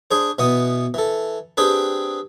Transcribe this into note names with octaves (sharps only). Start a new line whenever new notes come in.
D4 G#4 C5
B2 E3 B3 D#6
E3 A4
C4 D4 G4 G#4 B4